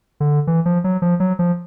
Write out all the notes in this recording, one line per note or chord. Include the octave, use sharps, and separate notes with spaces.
D3
E3
F3
F#3
F3
F#3
F3